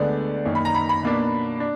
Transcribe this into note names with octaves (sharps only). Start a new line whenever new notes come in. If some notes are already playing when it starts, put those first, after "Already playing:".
Already playing: D2 D3 G#3 B3 D4 D5
F#2 D#3 A#3
B5
A#5
B5
B5
B2 A#3 D4
D4